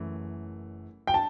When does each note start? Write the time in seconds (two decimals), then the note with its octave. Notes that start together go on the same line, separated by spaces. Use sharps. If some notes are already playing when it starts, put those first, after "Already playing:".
Already playing: F#1 F#2 E3 A3
1.07 G5
1.14 D4 A5